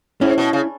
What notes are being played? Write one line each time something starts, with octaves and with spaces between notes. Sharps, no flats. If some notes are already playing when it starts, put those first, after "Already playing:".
G#2 C#4 E4
B2
C#3